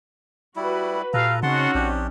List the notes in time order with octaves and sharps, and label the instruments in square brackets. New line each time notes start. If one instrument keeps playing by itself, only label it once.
[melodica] G3 E4 [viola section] F#4 B4
[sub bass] A#2 [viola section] G4 [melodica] A4 B4 A#5 [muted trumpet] F5
[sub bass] C#3 [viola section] C4 C#4 D#4 [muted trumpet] F#4 [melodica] F#5 A5 C6
[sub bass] A#1 [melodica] D4 G4